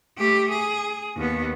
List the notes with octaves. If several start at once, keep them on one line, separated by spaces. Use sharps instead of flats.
A3 G4
G#4
D#2 B3